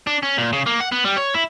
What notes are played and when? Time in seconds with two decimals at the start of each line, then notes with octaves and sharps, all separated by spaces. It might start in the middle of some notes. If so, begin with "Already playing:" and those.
0.07 D4
0.23 C#4
0.38 A#2
0.53 C#3
0.66 A#3
0.80 F#5
0.92 B3
1.05 G3
1.17 C#5
1.34 E4